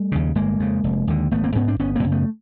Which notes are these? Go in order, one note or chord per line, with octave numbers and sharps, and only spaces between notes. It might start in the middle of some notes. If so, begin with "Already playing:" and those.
Already playing: G3 A3
D#2 C#3
G1 G#3 A#3
F2 C#3
F1
D#2 D3
G#1 A3 B3
A#3 C4
G#2 B3 C#4
C4 D4
G1 B3 C#4
A#3 C4
F#2 C#3
A3 B3